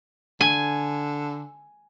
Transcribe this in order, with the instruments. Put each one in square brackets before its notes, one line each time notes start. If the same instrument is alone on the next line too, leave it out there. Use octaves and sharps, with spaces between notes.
[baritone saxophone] D3 [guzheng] G#5